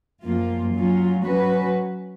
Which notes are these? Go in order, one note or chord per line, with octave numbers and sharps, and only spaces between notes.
F#2 F3 A#3 F4
F#3 C#4 F4
F#3 C#4 F#4 B4